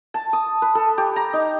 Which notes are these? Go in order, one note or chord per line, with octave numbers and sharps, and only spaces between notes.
A5
D#6
B4
A4
G4
A#5
D#4